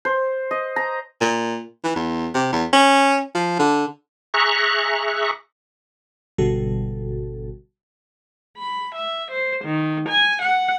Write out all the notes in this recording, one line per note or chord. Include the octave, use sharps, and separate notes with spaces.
C5
D#5
A#5
A#2
E3
E2
C3
E2
C#4
F3
D3
G#4 E5 A#5 C#6 F#6
G#1 B2 D3 G3 F#4 A4
B5
E5
C5
D#3
G#5
F#5